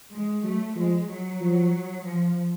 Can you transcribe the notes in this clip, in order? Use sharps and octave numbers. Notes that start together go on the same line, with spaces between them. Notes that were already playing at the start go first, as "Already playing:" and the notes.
G#3
F#3 A3
F3 G#3
F#3
F3
F3